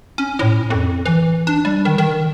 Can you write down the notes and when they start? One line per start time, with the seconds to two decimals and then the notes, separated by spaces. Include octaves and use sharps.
0.18 C#4
0.39 A2
0.70 F2
1.06 E3
1.47 D4
1.65 G3
1.85 D#3
1.98 D#3